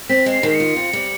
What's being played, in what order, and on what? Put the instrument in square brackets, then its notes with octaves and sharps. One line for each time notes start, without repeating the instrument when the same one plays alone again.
[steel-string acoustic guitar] C4 [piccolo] B6
[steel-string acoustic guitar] G#3
[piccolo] C7
[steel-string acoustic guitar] D#3
[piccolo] C7
C#7
[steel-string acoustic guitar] F4
C4
G3